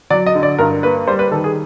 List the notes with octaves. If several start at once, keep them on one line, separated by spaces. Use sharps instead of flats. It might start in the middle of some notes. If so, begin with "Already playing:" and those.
F#3 D5
D#5
D3
D5
G2 A#4
A#3 B4
G3 C5
B4
D#3 A4
G#4